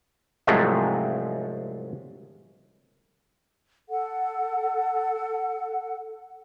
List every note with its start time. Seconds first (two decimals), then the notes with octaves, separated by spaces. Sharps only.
0.47 C2 G#2 F3 F#3 G#3 A3
3.90 A4 F#5